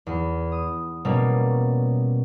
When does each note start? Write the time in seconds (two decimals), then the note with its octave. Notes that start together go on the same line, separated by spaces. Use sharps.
0.07 E2
0.52 D#6
1.05 B2 G3 A#3 C#4